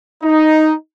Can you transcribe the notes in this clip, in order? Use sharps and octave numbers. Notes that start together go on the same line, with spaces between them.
D#4